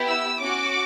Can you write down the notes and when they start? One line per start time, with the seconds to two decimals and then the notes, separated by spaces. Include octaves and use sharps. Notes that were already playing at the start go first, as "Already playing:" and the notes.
Already playing: B3 E4 G4
0.08 E6
0.39 C#4 F#4 D6